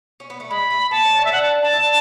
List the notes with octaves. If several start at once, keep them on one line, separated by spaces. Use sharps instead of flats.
C#4
B3
A3
G#3 B5
A3
B3 A5
C#4
D4
C#4
E5
D4 F#5
A5
D4 A5
E4